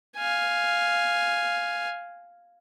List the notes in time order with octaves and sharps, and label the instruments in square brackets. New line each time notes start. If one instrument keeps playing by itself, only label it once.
[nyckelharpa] F5 G#5